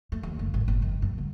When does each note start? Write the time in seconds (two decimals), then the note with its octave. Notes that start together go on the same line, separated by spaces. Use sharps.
0.12 A3
0.23 D#2
0.39 F#1
0.54 G#1
0.68 G1
0.82 D#3
1.02 G2
1.18 D3